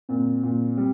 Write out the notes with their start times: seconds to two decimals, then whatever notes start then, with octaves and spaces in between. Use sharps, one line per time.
0.09 A#2 C4
0.43 A#2
0.77 G3 C4